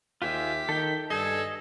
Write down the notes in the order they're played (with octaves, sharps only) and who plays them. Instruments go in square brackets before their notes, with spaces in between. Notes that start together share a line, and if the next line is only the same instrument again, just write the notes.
[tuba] D#2 [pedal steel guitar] F4 G#4 E5 [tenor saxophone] G4 [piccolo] B6
[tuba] D#3 [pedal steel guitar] A4 G5
[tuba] G2 [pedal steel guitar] G#4 D#5 [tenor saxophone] A4 [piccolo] G#6